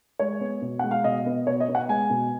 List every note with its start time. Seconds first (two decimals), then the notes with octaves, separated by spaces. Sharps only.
0.19 G#3 C#5
0.41 B3
0.62 B2
0.79 G#3 F#5
0.91 F5
1.04 B2 D#5
1.26 B3
1.47 B2 C#5
1.60 D#5
1.68 B3
1.75 F#5
1.88 G#3 G#5
2.10 B2